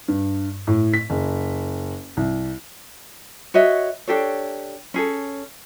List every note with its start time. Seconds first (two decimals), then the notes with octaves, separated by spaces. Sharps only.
0.08 G2
0.67 A2
0.94 B6
1.10 F#1
2.17 C2
3.54 F#4 C#5 D#5 E5
4.08 D4 G4 A4 C#5
4.94 C#4 G#4 A4